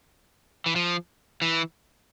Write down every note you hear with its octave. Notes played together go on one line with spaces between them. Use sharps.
E3
F3
E3